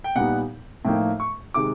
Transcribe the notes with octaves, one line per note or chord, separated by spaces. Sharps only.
G5
A#2 G3 B3 D#4 F#5
A2 F3 A#3 D#4 G5
C#6
C3 D#3 G#3 D6